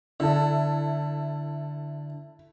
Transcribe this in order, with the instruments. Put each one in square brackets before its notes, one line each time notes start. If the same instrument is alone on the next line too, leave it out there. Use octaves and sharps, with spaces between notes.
[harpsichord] D3 [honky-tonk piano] E4 A4